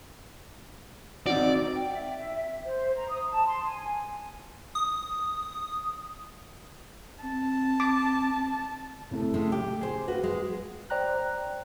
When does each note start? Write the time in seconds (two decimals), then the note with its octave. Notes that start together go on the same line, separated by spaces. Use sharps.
1.27 C4 D#4 F#4 D5
1.75 G5
1.91 E5
2.17 E5
2.33 E5
2.64 C5
2.95 A#5
3.09 D#6
3.32 A5
3.46 C6
3.64 G#5
4.75 D#6
7.23 C4 A5
7.80 D6
9.11 A2 C3 A3
9.34 A2 C#3 G#3
9.52 G4
9.81 G#4 C5
10.08 F#4 B4 F5
10.23 G#3
10.90 C5 D5 G5 A#5 F#6